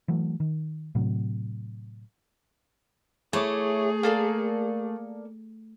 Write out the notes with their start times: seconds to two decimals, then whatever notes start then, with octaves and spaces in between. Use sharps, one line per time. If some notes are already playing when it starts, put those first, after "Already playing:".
0.08 E3 F#3 A3
0.40 D#3
0.95 A2 C3 F#3
3.33 A3 E4 G#4 C#5 D6
4.03 A#3 A4 D5